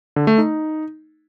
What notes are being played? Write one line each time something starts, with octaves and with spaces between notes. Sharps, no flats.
D3
A3
D#4